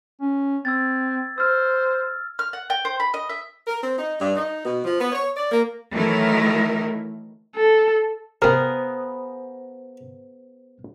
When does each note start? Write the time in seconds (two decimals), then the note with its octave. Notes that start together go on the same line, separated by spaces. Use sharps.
0.21 C#4
0.65 C4 E6 G#6 A6
1.38 C5 E6 F6
2.39 F6
2.53 F#5
2.70 G5
2.85 C5
3.00 B5
3.14 D#5
3.29 E5
3.67 A#4
3.82 C4
3.98 D#4
4.18 G2
4.36 D#4
4.64 B2
4.84 F3
5.00 B3
5.12 C#5
5.37 D5
5.51 A#3
5.92 D#3 E3 F#3 A3 E4 A#4
7.56 A4
8.42 C3 B3 C4 G#4 A#4 C5 F5